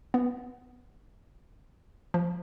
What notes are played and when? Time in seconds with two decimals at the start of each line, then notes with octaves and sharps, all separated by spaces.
0.14 B3
2.14 F3